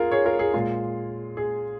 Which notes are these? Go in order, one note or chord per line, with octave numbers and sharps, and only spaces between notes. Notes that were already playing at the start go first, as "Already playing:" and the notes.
Already playing: F4 G#4 A#4
G#4 C#5
F4 A#4
G#4
A#2 G#3 F4
G#4